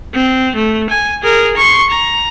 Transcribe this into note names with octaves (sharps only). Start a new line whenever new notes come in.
C4
A3
G#5
G#4 A#4
C6 C#6
A#5